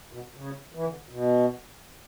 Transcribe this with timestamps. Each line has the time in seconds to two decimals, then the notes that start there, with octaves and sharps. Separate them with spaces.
0.12 B2
0.35 C#3
0.73 E3
0.85 D3
1.09 B2